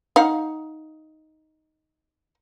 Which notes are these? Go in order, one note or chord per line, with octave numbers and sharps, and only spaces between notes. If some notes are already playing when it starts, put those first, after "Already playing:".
D#4 F5 F#5